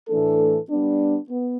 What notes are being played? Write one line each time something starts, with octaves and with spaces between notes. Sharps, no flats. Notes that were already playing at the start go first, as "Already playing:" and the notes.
A2 E3 A3 D4 A4
G3 B3 D4
B3